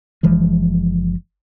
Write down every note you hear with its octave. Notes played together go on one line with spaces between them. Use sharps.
F#1 E3 F3 G#3